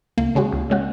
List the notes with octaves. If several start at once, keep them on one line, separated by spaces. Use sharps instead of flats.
C#2 A#3
C#3 G#3 C#4 F#4
C#2
C#3 G#3 C#4 F#4